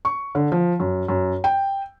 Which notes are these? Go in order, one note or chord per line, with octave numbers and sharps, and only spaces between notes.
C#6
D3
F3
F#2
F#2
G5